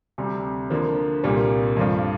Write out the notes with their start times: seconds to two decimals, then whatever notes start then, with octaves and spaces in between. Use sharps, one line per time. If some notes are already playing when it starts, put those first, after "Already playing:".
0.18 D2 C3 G3
0.70 D3 F3 A#3
1.24 C2 A#2 G3 A#3 F4
1.77 G2 F3 A3 D4 F4